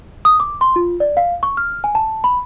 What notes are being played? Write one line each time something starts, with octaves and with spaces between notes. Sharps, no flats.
D#6
D6
C6
F4
D5
F5
C#6
F6
G#5
A5
B5